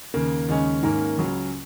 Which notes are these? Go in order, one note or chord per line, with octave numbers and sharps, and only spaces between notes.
D#2 C#3 A#3
D#2 C#3 G#3 C#4
G#2 D#3 A#3 C#4 A#4
C#2 C#3 F#3 C#4